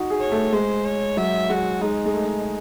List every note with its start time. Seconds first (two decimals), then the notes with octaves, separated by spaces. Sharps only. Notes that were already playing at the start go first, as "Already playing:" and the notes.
Already playing: D#4 F#4
0.10 G#4
0.20 C#5
0.32 A3
0.52 G#3 C5
0.85 C#5
1.17 F#3 E5
1.49 G#3 F#4
1.81 G#3 D#4
2.06 G#3
2.14 A3